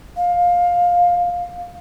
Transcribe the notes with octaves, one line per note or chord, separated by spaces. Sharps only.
F5